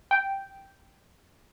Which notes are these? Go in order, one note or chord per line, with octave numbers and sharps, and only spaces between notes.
G5